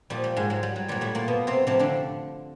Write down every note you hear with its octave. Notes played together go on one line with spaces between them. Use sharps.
A#2 F3 G3
G3
G#2 G#3
F#3
G3
F#3
A#2 F#3 G3
A2 A3
A#2 A#3
B2 B3
C3 C4
A2 C3 F3 C4
D3 D4